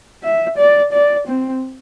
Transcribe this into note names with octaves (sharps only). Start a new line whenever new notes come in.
E5
D5
D5
C4